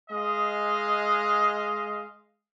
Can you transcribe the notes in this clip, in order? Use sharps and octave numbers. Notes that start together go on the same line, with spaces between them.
G#3 D#5 F5